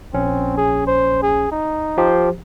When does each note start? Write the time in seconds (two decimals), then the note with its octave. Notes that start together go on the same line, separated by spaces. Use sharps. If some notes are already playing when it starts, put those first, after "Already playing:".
0.14 A#1 C4 C#4
0.57 G#4
0.87 C5
1.22 G#4
1.52 D#4
1.98 F3 G4 C5